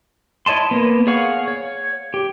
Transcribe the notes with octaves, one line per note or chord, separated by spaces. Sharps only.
E4 C#5 D#5 A5 C6
A#3 B3
G#4 C#5 F5 F#5 C#6
C#5
G4